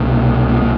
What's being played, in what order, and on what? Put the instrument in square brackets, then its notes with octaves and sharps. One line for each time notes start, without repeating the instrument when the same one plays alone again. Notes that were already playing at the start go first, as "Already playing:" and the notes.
Already playing: [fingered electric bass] C2 B2 A#3
A#3
A#3